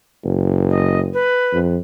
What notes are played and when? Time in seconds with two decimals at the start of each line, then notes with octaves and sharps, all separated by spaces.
0.24 F#1
0.70 D#5
1.13 B4
1.53 F2